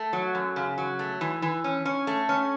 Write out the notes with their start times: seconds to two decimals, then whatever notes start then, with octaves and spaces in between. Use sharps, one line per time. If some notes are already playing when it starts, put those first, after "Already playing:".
Already playing: A3
0.13 F#3
0.35 F#2
0.56 C#3
0.78 F#3
0.99 A3
1.21 E3
1.42 E3
1.64 C#4
1.85 C#4
2.07 A3
2.29 C#4